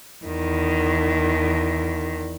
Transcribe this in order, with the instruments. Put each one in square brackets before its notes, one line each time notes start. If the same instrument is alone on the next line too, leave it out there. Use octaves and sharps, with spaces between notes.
[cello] E2 D#3